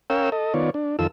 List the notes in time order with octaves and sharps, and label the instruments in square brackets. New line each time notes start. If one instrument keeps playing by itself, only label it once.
[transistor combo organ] C#4 A#4 C#5 F5 G5 E6
A4 D#5
D#3 B3 F4 C#5 D5
D4
F2 D#3 F4 A4 E6